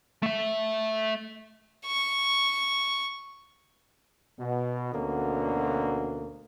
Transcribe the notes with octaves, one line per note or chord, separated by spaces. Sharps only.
A3 E5
C#6
B2
D2 B2 D3 A#3 C#4